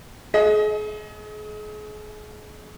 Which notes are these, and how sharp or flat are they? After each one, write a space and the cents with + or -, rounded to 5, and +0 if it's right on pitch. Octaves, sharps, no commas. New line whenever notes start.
G#4 +35 D#5 +20